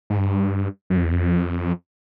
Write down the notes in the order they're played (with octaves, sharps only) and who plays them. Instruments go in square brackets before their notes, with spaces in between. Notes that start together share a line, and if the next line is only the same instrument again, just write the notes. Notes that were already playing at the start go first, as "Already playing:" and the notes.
[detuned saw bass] G#2
G2
F#2
F2
E2
F2